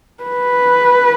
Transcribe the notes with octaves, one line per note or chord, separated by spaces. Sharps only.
B4